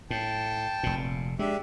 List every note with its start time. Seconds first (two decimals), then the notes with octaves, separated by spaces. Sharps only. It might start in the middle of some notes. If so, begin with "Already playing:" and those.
0.10 A2 G5 A5
0.83 F1 A#2
1.39 G#3 D4 G4 E5